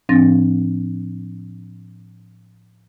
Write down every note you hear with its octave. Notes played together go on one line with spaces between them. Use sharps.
A2 F3 C4 D4 A6 A#6